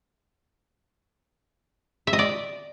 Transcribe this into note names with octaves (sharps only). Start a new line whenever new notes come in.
E5
D#5
D5